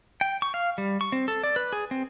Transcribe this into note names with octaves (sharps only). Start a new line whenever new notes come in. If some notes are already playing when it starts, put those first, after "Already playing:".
G5
C#6
F5
G3
C#6
C4
A4
D5
B4
G#4
C4